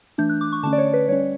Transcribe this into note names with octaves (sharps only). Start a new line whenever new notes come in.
E3 A3 D4 G6
F#6
D6
C#6
D3 A3 C#4 A5
D5
C#5
B4
G3 C#4 C#5